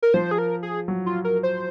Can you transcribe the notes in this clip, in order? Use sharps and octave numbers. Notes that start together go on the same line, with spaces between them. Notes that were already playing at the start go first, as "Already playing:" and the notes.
A#4
F3 C5
G#4
A#4
G#4
F#3
F4
A#4
C5